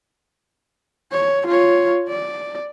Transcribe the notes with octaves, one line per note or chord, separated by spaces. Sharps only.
C#5
F4 C#5
D5